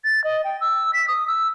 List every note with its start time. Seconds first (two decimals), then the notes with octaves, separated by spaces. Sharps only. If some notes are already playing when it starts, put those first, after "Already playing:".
0.04 A6
0.24 D#5
0.44 G5
0.61 E6
0.93 B6
1.08 D#6
1.27 E6